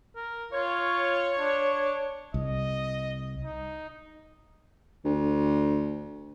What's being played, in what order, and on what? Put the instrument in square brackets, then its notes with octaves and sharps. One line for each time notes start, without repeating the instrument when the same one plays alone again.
[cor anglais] A#4
[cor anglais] F4 [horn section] C#5
[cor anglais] D4
[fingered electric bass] C2 [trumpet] D#5
[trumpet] D#4
[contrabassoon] D2